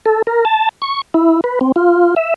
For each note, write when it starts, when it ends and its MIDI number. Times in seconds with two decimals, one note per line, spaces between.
0.06 0.22 69
0.27 0.45 70
0.45 0.69 81
0.82 1.01 85
1.14 1.41 64
1.44 1.59 71
1.61 1.72 60
1.76 2.15 65
2.16 2.34 76